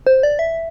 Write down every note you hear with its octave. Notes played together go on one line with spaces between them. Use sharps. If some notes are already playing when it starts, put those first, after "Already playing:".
C5
D5
E5